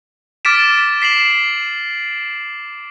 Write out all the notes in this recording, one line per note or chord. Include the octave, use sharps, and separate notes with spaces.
D6 F6 A6 B6 D7 E7
B6 C7 E7 F#7